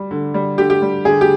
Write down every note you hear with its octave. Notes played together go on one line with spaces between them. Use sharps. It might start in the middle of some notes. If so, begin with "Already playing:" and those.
Already playing: G3
D3
G3
D3 G4
G4
G3
D3 G#4
G4